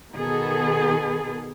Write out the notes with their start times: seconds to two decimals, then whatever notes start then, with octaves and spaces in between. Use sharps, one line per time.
0.14 B2 D#3 B3 G#4 A4